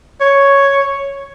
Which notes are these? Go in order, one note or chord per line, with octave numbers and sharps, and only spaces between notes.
C#5